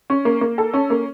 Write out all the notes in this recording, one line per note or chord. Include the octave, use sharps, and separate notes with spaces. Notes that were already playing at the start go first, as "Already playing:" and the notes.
C#4
A#3
A#3
A4
C#4
A#3